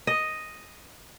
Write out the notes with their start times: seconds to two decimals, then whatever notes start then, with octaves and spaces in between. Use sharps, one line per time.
0.07 D#5